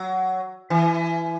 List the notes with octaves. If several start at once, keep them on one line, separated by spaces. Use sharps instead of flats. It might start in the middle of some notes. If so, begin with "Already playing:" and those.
Already playing: F#3
E3